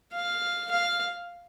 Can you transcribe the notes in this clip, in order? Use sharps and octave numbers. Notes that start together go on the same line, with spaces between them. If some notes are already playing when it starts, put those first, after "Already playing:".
F5
F5